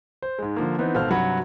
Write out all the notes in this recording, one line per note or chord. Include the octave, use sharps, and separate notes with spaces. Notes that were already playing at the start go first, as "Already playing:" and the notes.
C5
G#2 G#3
D3 F3 A#3
E3 B3 C4 D#4
G#1 B2 A4 C5 F5 F6
G2 C3 F#3 F#5 B5